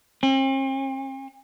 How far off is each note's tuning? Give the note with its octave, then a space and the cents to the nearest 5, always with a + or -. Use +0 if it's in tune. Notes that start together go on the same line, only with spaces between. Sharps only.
C4 +45